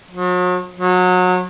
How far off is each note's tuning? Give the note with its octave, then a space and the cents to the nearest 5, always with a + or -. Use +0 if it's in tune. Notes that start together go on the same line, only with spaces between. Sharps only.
F#3 -45
F#3 -30